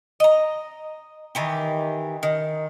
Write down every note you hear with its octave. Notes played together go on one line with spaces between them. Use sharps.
D#5 A#5
D#3 E3 G4
D#3